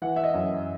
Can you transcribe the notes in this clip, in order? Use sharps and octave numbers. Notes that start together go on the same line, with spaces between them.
E3 F#5
E5
D#5
F#2